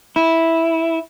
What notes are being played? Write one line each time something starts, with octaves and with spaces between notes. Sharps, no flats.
E4